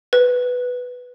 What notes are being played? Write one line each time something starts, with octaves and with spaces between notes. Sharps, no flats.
B4